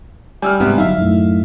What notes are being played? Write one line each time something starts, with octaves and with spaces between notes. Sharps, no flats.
G3 G#5 E6 F6
G#2 C3 G3 B3
G1 F#3 D#4 E5 F5
F#2 A2